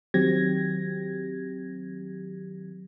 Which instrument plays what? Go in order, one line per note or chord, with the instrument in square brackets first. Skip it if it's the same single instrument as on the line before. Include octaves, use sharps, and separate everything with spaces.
[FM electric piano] D#3 F#3 C4 G4 G#6 A#6